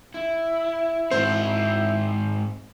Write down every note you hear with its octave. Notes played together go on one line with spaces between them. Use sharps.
E4
G#2 C4 C5